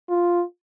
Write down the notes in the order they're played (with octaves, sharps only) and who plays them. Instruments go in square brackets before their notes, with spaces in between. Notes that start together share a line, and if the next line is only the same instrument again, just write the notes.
[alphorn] F4